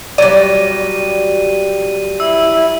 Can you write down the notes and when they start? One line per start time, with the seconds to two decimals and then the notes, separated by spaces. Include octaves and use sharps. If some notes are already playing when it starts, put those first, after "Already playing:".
0.18 F#3 G3 D5 D#7
2.20 E4 E6